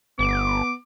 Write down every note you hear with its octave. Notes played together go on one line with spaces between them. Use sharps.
G1 B3 D6